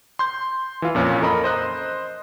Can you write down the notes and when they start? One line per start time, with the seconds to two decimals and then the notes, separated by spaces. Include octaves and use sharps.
0.19 C6 G6
0.82 E3 F4
0.95 F2 A#2 C#4
1.21 A4 A#4 D#5 B5
1.44 C5 D#5 F#6